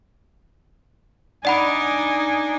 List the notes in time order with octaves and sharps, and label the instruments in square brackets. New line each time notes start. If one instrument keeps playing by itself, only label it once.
[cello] D4 D#4 [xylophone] D5 F#5 B5 [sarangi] G#5